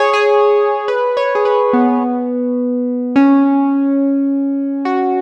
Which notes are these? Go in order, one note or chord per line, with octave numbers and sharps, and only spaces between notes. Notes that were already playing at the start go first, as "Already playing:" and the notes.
Already playing: G#4 C#5
G#4
B4
C#5
G#4
B4
B3
C#4
F#4